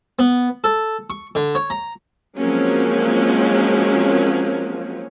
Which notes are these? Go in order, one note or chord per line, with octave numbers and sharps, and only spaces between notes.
B3
A4
C#6
D3
C#5
A#5
F3 F#3 G#3 A#3 C4 C#4